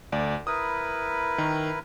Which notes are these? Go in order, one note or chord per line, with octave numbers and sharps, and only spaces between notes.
D2 D5
E4 A#4 B4 D#6
D#3